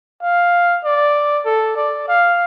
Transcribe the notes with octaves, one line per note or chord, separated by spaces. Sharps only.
F5
D5
A4
D5
F5